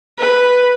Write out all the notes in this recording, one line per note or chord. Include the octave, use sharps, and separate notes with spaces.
B4